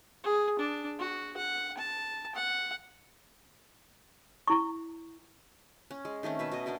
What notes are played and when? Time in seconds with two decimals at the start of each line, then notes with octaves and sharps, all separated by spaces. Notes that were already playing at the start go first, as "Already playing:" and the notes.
0.24 G#4
0.59 D4
0.99 F#4
1.37 F#5
1.77 A5
2.35 F#5
4.48 E4 C#6
5.91 C#4
6.05 G#3
6.23 D#3 A3 C4 C#4
6.39 B2 B4 E5
6.52 B2 D#5
6.66 D4 F#4 A#4 D#5